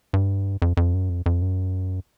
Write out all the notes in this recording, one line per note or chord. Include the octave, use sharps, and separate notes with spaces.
G2
F2
F2
F#2
F2
F2
F#2